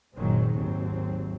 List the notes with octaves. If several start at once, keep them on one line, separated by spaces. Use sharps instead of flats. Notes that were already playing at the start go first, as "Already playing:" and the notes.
F#1 A#2 D#3 F#3 G#3 C4
G#1 D#2 F#3 C4